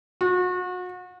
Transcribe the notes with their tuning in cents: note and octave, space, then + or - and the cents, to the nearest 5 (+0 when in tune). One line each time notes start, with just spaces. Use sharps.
F#4 -35